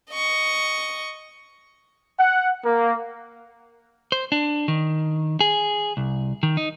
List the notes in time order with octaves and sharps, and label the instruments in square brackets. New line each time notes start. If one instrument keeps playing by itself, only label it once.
[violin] D#5 C#6
[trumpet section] F#5
A#3
[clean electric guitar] C5
D4
D#3
G#4
C2
D#3
D#4